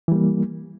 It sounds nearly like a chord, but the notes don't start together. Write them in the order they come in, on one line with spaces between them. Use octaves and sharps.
E3 G3 A#3